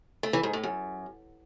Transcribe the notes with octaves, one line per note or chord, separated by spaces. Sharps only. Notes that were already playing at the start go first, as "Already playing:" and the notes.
A3
E3
G#2
A2
F#2